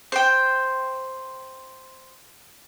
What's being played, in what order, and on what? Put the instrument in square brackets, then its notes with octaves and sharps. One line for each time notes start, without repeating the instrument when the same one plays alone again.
[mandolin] C5 G5